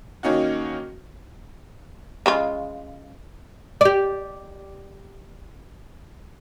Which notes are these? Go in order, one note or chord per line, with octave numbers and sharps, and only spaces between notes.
D#3 A#3 C#4 D#4 F#4
C#3 G#3 F4
G4 D5